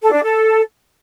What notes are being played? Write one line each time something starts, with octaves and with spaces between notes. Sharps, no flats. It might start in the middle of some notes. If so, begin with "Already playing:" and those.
A4
D4
A4